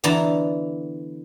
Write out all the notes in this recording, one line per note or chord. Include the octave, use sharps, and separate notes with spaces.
D3 E3 B3 A5 A#5